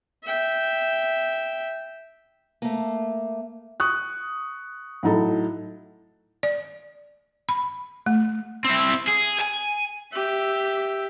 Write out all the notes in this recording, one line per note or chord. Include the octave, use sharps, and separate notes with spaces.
E5 G5
A3 A#3
C#6 D#6 F#6
A2 F#3 D#4 A4
D5
B5
A3
C4 E4
G#4
G#5
G4 E5